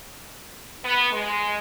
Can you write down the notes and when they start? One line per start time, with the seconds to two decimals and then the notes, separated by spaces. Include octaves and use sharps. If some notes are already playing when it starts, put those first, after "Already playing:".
0.84 B3
1.12 G#3